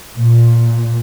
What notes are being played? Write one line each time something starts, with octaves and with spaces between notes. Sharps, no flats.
A#2